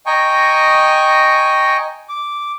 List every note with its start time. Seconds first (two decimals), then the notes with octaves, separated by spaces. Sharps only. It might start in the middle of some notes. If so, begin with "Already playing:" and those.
0.06 D#5 G5 G#5 A#5 C#6
2.09 D6